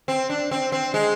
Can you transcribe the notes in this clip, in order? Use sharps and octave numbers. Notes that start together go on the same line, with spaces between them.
C4
D4
C4
C4
G#3